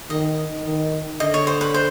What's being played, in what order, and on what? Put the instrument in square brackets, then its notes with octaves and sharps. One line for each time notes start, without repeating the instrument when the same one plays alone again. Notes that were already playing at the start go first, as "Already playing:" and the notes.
[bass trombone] D#3 [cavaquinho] D#5
[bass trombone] D#3
[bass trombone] D3 [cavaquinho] D#5
[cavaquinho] C#5
C5
B4
C5